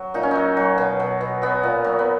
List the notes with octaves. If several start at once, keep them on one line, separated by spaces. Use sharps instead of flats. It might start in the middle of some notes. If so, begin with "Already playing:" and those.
Already playing: F#3
A#2 D#4
C#4
F#3 D#4
F#3
B2
B2
B2
F#3 B3
A#2
F#3
B3